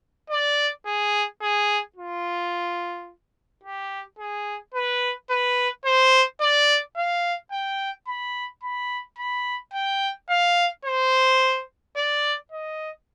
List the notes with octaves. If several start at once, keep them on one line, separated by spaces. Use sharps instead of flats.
D5
G#4
G#4
F4
G4
G#4
B4
B4
C5
D5
F5
G5
B5
B5
B5
G5
F5
C5
D5
D#5